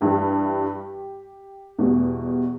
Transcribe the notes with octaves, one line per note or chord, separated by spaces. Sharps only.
G2 E3 G3 G4
E2 B2 G3